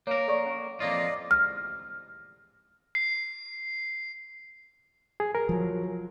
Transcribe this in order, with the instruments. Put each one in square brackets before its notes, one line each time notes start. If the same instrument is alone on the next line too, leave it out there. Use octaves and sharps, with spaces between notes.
[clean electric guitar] A#3 A#4 [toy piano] C#5
[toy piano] A4 D5 C#6
C#4
[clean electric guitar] F2 A#3 F4 [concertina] D5 D#5
[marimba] F6
[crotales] C7
[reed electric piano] G#4
A#4
[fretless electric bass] F3 F#3